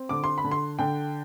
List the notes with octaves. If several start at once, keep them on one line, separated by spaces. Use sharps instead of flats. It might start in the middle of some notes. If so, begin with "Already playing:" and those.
Already playing: C4
D3 D6
C6
B5
D3
C6
D3 G5